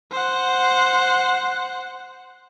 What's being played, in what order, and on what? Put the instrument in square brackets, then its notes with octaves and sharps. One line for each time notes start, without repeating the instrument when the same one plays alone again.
[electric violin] C5 F#5